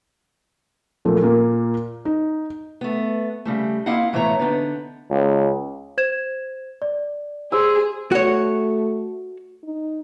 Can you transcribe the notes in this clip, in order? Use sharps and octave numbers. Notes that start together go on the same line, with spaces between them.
A#2 F3 A3
A#2 A#3
D#4
A3 B3
C#3 G3 A3
A#3 C4 E4 D#5 F5 F#5
A2 E3 A3 B3 C#5 A#5
D3 B3 C#4 D#4
C#2
C5 G#6 E7
D5
G#4 C5 D6 E6
A3 F#4 C#5
D#4